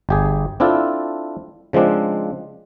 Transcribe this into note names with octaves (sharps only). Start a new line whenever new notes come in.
G1 G4 G#4
C4 D4 E4 F4 A4
C#3 F3 G#3 C4 D4